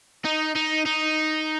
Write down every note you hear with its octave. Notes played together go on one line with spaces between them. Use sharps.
D#4
D#4
D#4